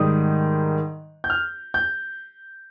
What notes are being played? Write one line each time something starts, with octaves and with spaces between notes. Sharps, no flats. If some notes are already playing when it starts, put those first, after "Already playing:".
Already playing: G#2 D#3 G3 D#6
G6
F6
G6